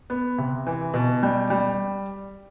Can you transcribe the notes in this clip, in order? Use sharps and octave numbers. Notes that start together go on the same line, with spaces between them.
B3
C3
E3
B2
G3
G3